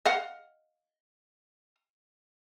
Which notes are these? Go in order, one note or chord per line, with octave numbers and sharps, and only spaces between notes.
D#5 F5 F#5